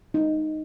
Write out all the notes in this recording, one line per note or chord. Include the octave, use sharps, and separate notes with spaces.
D#4